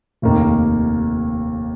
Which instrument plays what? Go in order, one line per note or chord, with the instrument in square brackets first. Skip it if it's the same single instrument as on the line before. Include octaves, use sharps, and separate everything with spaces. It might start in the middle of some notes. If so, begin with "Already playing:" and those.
[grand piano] F1 D#2 D#3 A#3